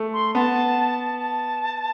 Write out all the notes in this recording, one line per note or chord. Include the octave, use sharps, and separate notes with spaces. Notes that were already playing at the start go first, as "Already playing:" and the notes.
Already playing: A3
C6
B3 A5
A5